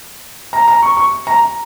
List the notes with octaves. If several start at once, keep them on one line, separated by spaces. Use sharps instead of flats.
A#5
A#5
C#6
C#6
A#5